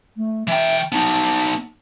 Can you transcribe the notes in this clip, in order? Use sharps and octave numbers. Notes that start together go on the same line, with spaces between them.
A3
E3 E5 G5
B3 D#4 A5